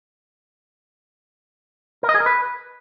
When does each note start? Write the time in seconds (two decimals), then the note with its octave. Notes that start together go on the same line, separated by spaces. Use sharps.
2.03 A#4
2.09 D#5
2.15 G#4
2.20 A#4
2.26 B4